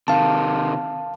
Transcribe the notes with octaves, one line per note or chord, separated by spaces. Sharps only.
C3 D#3 F5 A5